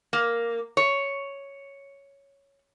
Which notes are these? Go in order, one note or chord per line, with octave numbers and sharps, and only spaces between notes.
A#3
C#5